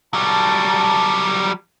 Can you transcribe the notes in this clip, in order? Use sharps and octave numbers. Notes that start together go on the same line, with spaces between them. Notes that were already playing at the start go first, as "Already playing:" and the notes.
F#3 G3 A5